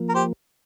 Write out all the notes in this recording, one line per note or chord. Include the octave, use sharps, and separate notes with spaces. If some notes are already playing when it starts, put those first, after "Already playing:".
Already playing: F3 A#3
A#4
G4 C5